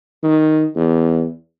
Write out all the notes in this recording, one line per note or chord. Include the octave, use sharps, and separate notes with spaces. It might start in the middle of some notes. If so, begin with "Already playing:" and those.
D#3
E2